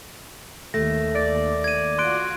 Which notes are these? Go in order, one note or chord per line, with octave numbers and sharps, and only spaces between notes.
D#2 A3 A#6
D5
G#6 D#7
F4 F#4 C6 F#6 D7